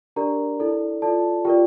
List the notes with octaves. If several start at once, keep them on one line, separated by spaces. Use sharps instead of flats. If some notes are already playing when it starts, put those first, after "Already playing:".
D4 G4 A#4 D5 A#5
E4 A4 D5
F4 A4 D5 A5
F4 G4 A#4 D5 G5